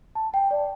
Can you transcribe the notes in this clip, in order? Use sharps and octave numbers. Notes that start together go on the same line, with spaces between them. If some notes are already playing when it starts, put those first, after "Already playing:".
A5
G5
D5